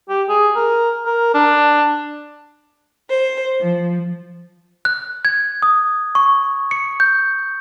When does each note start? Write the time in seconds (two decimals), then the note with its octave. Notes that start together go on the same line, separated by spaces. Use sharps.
0.09 G4
0.29 G#4
0.56 A#4
1.06 A#4
1.35 D4
3.09 C5
3.60 F3
4.85 F#6
5.25 G#6
5.62 D#6
6.15 C#6
6.71 C#7
7.00 G6